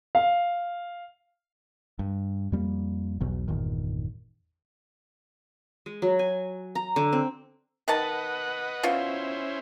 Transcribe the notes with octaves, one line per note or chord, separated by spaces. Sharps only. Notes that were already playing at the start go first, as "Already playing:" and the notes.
F5
G2
F2 G3 A#3
B1 E2 B2 F#3
G1 E2 A#2 D#3
G#3
F#3
G#5
A#5
D3
C4
D#3 D#4 B4 D#5 F#5 A5
B2 C#4 E4 F4 C5